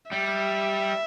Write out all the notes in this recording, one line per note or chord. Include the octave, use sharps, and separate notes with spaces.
G3 E5